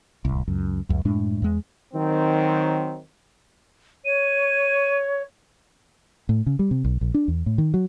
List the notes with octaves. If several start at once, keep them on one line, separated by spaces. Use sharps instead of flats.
D1 C2
C#2 F#2
C#2 F#2
F#2 A2 G#3 D4
E2 G#3
D#3 F#3 C4
C#5 D#7
A2
C#3
G3
C3
B1
A#1
D4
E2
A2
D#3
F#3